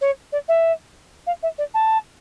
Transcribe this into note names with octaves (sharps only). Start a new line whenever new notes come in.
C#5
D5
E5
F5
E5
D5
A5